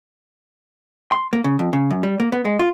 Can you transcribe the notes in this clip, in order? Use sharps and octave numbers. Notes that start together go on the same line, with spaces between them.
C6
A#3
C#3
F2
C#3
F#2
G3
A#3
B3
G#3
F4